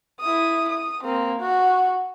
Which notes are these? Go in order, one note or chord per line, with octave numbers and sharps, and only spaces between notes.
E4 D#6
D#6
A#3 C4
F#4